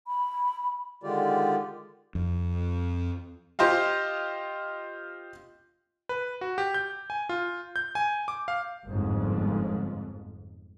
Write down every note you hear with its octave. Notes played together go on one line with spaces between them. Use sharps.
B5
D3 D#3 G#3 F4 G4 D5
F2
F4 G4 C5 D#5 F5
B4
F#4
G4
G6
G#5
F4
G6
G#5
D6
F5
G1 F2 G#2